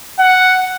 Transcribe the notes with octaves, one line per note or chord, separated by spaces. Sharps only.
F#5